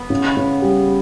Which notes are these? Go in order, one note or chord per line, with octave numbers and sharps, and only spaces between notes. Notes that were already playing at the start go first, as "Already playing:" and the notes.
Already playing: B3
C#3
C#3
G3